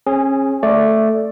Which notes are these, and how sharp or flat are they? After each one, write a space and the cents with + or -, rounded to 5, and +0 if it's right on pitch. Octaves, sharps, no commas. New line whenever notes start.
C#4 -35 G#4 +0
A3 +0 D5 +0